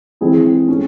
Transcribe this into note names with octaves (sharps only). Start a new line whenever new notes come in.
E3 G#3 C4 E4 G#4
G#3 C#4